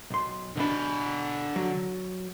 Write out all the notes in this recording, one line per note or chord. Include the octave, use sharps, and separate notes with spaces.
B1 C6
B2 D3 D4 B5
F#3